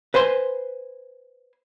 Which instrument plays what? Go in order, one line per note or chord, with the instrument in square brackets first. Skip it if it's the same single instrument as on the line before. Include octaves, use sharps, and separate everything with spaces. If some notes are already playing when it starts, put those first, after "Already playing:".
[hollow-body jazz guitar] B4 C5 G#5 C6